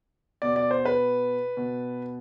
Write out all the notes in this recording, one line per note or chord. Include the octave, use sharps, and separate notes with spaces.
B2 D5
D5
C5
B4
B2